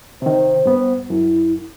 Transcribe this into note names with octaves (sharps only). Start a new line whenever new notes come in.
C3 D#3 C5
G2 B3
F#2 E4